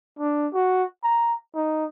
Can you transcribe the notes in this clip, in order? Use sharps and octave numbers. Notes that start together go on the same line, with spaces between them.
D4
F#4
A#5
D#4